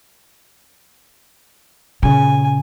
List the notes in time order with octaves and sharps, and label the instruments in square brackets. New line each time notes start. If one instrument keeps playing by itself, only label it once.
[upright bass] A#2 C#3 [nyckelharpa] G#5